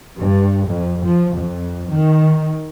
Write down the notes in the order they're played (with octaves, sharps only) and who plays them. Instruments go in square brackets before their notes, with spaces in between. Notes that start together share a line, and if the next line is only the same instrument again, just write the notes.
[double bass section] G2
F2
F3
F2
D#3